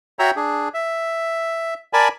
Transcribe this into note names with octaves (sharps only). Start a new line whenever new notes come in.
F#4 C#5 E5 G5 A#5 E6
D4 G#4
E5
A#4 D5 G#5 A5 B5